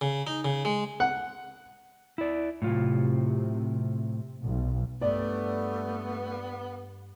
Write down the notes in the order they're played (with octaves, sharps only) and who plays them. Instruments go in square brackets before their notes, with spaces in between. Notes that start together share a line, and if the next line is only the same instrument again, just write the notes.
[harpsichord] C#3
D#4
C#3
G#3
[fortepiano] F#5
[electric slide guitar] E4 D5
[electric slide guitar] A2 F#3 F4 [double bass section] C3
[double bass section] B1
[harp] G2 [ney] A3 [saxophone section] B3 [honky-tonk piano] D5